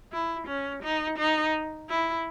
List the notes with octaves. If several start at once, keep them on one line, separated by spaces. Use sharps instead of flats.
E4
C#4
D#4
D#4
E4